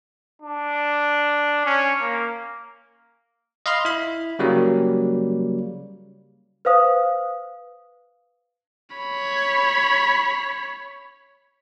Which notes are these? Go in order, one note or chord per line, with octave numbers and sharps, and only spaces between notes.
D4
C#4
A#3
D#5 F5 B5 C6 F6
E4 B5
C#3 F#3 G3 A#3
B4 C5 F5 D#6
C#5 B5